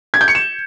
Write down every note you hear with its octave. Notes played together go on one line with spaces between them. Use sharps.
G#6
G6
C#7
E7